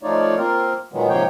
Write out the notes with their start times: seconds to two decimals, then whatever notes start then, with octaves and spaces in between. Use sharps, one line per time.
0.03 F3 A3 D#4 F4 C#5 D5
0.37 A#3 C4 F4 A#4
0.93 A#2 D#3 F#3 G#3 B3
1.09 G#2 C3 F3 A#3 C#5 G5